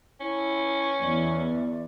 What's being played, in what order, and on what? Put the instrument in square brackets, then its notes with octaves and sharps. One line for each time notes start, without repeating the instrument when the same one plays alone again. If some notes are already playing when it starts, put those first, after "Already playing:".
[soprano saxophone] C#4 [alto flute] E4
[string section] E2 [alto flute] D5